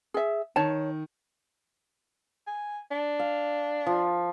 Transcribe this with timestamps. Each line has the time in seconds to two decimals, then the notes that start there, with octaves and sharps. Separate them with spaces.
0.14 G#4 E5
0.56 D#3 C#5 A5
2.47 G#5
2.91 D4
3.19 F5
3.87 F3